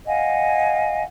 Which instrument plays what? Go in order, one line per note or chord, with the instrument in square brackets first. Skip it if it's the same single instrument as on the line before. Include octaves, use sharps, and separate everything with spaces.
[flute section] D#5 F5 F#5 G#5